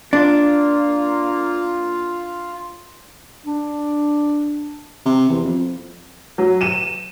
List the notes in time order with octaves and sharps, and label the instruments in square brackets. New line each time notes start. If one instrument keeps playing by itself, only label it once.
[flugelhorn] A#3 [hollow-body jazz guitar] D4 [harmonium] F4
[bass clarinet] D4
[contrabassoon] C3
E2
F2
[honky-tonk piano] F#3
D#7 E7